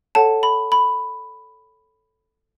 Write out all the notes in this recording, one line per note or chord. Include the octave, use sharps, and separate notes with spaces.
A4 C#5 F#5 A5
B5
B5